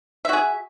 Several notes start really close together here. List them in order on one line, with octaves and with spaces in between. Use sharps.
E5 F#4 G#4